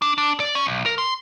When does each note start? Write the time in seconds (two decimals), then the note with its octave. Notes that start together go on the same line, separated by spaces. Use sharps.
0.02 D4
0.18 D4
0.40 D5
0.55 C#4
0.67 B1
0.86 A#4
0.98 C6